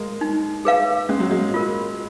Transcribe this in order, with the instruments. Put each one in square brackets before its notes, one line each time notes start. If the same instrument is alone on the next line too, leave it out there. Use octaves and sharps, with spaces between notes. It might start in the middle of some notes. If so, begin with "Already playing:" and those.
Already playing: [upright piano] G#3 A#3
[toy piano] D#4
G#4 B4 F5
[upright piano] G#3 [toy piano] C#4
[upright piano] F#3
G#3
[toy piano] F4 A#4